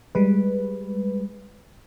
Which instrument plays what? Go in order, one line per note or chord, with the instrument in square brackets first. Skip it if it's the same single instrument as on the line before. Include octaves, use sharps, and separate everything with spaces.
[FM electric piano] G3 G#3 B4